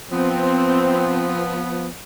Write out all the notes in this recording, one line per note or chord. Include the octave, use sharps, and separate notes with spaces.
F3 B3 C4